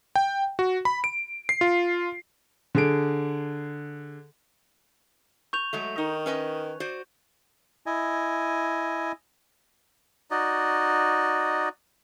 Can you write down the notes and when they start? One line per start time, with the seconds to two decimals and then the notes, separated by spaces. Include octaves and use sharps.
0.16 G5
0.59 F#4
0.85 B5
1.04 D7
1.49 C7
1.61 F4
2.75 D3 G#4 D7
5.53 C#6 G6 F7
5.73 F#3 G#3 A3
5.98 D#3 D#4
6.26 C#4 B4 D#5
6.80 F#4 C5 D5
7.86 E4 D#5 G#5
10.31 D#4 F#4 D5 D#5